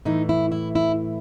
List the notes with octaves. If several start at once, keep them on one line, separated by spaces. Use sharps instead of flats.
A2 E3 D#4
E4
E4
E4